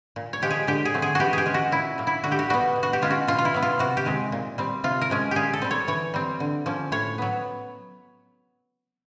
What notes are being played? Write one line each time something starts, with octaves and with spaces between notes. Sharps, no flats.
A#2
C#5
F3 G#3 G4
G#4
D3 G4
G#4
F#3 A3 C4
G#4
E3 F#4 G4
G4 G#4
G#3 C#4
F#4
A#2 E4
F#3 A#3
E4
D3 F#4
G4
F#4
G3 B3 F#4
B2
F#4
G4
G#3 C#4 F4
F#4
B2 F4
F4
E4
F#3 B3
F4
C3 F#4
G4
D#3 G#3 C4
A#2
G3 C4
C3 F4
A#4
F3 G#3 C#4
A#2 G4 G#4
A4
G3 C4
C#5
E3 C#5
G3 C4
D3
F3 A#3 C#4
A2 C#5
F#3 B3